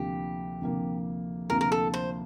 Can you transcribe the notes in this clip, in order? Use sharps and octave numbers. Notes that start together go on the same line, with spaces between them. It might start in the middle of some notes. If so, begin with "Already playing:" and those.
Already playing: D2 C3 F3 A#3 G4
D2 C3 F3 A#3
D2 C3 F3 A#3 A#4
A#4
A4
C5